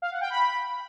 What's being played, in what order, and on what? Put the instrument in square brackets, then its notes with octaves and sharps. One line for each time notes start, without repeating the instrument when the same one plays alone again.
[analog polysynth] F5
F#5
G5
B5